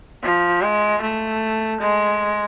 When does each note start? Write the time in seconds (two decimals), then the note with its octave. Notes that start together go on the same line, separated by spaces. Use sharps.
0.23 F3
0.62 G#3
1.02 A3
1.80 G#3